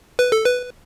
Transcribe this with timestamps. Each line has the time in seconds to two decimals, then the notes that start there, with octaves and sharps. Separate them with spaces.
0.19 B4
0.32 A4
0.45 B4